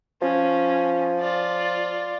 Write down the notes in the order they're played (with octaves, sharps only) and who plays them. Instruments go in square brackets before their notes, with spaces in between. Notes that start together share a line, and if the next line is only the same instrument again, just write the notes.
[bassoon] F3 [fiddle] C#4
[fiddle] F4 D5